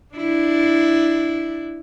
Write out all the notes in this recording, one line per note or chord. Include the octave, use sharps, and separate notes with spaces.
D4 E4